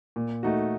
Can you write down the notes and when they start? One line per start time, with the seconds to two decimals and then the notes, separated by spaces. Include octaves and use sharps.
0.16 A#2
0.43 A3 D#4 F#4